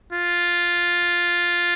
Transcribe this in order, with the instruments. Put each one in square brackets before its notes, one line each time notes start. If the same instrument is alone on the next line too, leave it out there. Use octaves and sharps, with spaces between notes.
[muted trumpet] F4